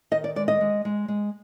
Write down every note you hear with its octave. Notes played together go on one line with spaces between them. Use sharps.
D#3 D#5
D5
G#3 D5
D#5
G#3
G#3
G#3